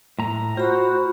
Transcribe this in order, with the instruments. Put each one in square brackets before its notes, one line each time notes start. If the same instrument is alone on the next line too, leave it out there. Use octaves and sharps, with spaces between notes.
[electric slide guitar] A2 A#5
[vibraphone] F4 B5 [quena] F#4 [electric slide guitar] C5